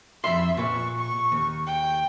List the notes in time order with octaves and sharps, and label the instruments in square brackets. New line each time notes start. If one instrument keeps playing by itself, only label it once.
[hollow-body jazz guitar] F2 B5 C6 [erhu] E5
[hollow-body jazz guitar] A#2 B4 [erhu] C#6
[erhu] C#6
[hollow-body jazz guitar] D#2
[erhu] G5